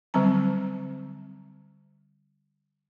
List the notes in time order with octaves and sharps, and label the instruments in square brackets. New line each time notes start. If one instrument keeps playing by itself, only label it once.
[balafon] D3 F#3 G3 C4 A#5